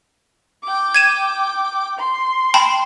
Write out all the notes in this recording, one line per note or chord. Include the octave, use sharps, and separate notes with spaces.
G5 D6
G#6 D#7 E7
C6
G5 A5 B5